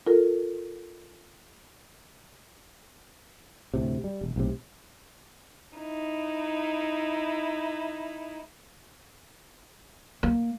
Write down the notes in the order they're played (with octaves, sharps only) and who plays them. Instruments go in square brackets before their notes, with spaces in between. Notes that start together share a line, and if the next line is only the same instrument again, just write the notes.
[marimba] F4 A4 A#4
[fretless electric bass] D2 A2 C3
G3
E1
B1 A2 C3
[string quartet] D#4 E4
[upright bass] A#3